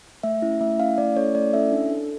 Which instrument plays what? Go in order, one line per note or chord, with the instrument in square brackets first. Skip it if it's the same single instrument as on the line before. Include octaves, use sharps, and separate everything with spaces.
[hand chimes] A3 E5
C#4 E4
A3 E5
C#4 E4 F5
A3 D5
C#4 E4 A4 C#5
A3 D5
C#4 E4 A4 E5
D4
A4